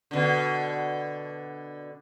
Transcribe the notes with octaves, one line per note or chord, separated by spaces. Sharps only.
B2 D3